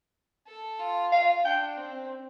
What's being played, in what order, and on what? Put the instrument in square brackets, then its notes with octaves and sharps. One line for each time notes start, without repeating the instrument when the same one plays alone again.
[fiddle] A4
F4
[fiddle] F4 [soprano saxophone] F5
[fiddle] D4 [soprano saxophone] G5
[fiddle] C4